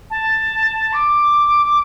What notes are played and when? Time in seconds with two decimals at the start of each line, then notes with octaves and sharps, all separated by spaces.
0.11 A5
0.93 D6